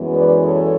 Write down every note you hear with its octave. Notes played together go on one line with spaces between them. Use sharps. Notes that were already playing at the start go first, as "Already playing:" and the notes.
Already playing: F#2 E3 G#3 B3
B4 D5
A4 C#5